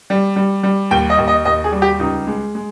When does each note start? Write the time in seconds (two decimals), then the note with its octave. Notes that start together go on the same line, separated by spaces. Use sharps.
0.10 G3
0.36 G3
0.63 G3
0.91 D#2 G5
1.10 D#5
1.18 D#2
1.27 D#5
1.45 D#2 D#5
1.64 G#4
1.72 G3
1.82 G4
1.99 C#2 D#4
2.27 G#3
2.55 G#3